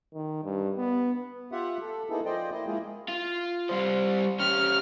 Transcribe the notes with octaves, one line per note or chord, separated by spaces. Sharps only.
D#3
G2
B3
F4 G4 E5 F#5
A4
A#3 B3 D#4 E4 G#4 A4
F3 C5 D5 D#5 G5
A#3 E4 D#5
G#3 A#3 E4 F4 G#4
F4
G3 C5
C#4 G4 F6